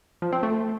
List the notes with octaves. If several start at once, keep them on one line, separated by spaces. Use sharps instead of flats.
F3
C4
A3